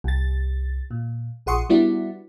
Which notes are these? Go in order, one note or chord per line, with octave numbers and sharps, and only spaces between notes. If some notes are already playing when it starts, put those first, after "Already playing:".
C2 A6
A#2
A#1 G#4 F#5 C6 C#6 D#6
G3 B3 D4 E4 F#4